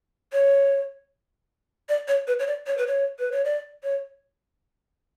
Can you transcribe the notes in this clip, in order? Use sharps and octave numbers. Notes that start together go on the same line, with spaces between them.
C#5
D5
C#5
B4
C#5
D5
C#5
B4
C#5
B4
C#5
D5
C#5